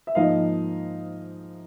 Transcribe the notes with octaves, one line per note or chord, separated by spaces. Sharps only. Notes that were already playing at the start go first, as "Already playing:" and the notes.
E5
G#2 F3 A#3 D#5 F5